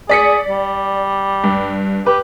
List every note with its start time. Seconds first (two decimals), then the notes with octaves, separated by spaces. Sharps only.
0.09 G#4 D5 B6 C#7
0.49 G3
1.44 G2
2.06 G4 B4